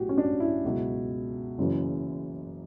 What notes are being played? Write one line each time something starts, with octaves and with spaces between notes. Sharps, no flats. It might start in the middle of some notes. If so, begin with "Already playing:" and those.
Already playing: B1 A2 F#3 F#4 G4
C#4
D4
E4
C#2 B2 F#3
F#1 F#2 C#3 E3